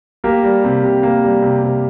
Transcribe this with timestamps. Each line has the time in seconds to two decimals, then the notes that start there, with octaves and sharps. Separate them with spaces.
0.24 A#3 G4 A#4
0.44 G3
0.64 C3
0.84 C3
1.03 A#3
1.24 G3
1.42 C3
1.63 C3